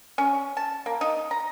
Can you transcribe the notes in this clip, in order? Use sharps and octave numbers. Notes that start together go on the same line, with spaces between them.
C#4
A5
A#3
D#4
A#5